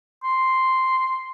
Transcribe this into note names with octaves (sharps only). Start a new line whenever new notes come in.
C6